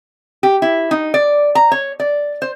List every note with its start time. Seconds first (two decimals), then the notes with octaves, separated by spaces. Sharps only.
0.43 G4
0.62 E4
0.91 D#4
1.14 D5
1.55 A#5
1.72 C#5
2.00 D5
2.42 C5